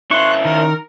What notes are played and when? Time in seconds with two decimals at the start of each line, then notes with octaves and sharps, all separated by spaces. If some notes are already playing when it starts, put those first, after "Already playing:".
0.11 C#3 E4 C6 C#6 F#6
0.45 D#3 A#4